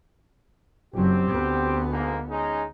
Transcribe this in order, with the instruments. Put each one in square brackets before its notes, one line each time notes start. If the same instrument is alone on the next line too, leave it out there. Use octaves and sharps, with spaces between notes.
[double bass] F#1 F#3 [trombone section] C4 G4
[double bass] D2 B3
[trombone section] G#2 A#3
G#3 C#4 D#4